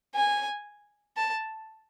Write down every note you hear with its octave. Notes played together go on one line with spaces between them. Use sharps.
G#5
A5